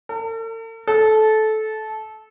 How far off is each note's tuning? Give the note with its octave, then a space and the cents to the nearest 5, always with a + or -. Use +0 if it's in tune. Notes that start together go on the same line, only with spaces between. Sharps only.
A4 +45
A4 -20